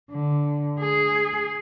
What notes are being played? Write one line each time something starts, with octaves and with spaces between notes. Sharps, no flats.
D3
G#4